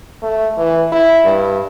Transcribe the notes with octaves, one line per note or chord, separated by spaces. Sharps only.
A3
E3
E4
G2